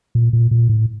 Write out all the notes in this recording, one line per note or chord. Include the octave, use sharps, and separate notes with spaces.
A#2
A#2
A#2
A2